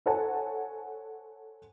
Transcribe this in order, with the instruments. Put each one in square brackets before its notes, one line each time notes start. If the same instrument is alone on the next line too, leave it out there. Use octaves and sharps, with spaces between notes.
[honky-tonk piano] A4 C5 C#5 F#5 G#5 A5